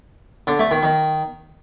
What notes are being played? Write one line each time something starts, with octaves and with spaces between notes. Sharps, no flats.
D3
A3
D#3
D#3